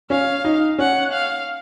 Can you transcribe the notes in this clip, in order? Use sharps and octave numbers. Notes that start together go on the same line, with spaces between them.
C#4 F5
D#4
C#4 F#5
F5